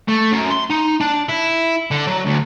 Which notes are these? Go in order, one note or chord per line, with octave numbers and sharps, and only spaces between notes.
A3
F#2
C6
D#4
D4
E4
D3
F#3
D2